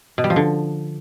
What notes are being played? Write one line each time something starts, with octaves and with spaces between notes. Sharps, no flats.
B2
G3
F3
D3